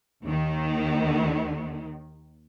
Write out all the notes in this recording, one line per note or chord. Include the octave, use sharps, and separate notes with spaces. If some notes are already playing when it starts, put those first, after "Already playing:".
D#2 D#3